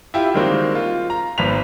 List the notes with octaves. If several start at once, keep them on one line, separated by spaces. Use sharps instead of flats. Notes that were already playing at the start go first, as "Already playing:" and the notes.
E4 F4 G4
D#3 G3 G#3 A#3 C4 F#4
F4
A#5
G#1 B3 B6 F7